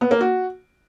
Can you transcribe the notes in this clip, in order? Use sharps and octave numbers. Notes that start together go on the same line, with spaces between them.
B3
A#3
F#4